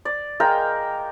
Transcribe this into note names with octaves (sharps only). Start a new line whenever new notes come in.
D5
G#3 A#4 F5 G5